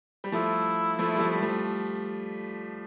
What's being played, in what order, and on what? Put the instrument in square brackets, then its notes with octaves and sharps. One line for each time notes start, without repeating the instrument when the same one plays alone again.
[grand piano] G3
[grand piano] F3 A3 [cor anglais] E4
[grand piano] F3 A3
G3
F3 A3
G3
F3 A3